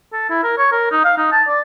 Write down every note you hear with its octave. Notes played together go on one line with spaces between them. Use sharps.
A4
E4
A#4
C#5
A#4
D#4
F5
D#4
A5
D5